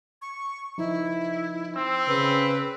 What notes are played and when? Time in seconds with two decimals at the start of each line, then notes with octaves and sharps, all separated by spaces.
0.22 C#6
0.78 F3 D#4 E4
1.76 C4 E6
2.08 C#3 B4